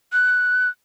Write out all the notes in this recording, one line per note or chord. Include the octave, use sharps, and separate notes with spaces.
F#6